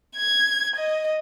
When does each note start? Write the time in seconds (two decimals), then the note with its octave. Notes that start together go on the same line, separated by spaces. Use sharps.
0.16 G#6
0.76 D#5